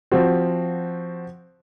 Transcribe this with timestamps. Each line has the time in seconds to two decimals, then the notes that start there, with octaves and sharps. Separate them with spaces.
0.12 F3 C4 F#4